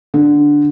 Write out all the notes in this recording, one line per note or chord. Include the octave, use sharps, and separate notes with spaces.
D3